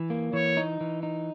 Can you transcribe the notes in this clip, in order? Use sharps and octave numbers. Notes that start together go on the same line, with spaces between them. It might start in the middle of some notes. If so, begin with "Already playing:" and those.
Already playing: E3
A#3
E3 C#5
D#4
E3
D#4